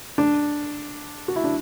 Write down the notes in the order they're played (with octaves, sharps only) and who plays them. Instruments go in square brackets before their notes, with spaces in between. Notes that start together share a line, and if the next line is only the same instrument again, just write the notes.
[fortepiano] D4
F#4
E4
D4